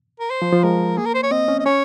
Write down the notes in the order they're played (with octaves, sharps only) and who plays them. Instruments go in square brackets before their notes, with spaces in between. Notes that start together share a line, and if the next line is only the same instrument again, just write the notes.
[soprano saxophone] A#4
C5
[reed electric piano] F3
F3
[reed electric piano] G#3 [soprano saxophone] A#4
[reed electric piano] A#3 [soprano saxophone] G#4
[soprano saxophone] A#4
C5
C#5
[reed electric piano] C4 [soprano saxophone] D#5
[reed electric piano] C#4
[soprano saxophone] D#5
[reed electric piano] C#4 [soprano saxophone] C#5